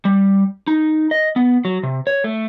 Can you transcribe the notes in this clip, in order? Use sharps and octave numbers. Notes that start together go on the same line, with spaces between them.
G3
D#4
D#5
B3
F#3
C3
C#5
A3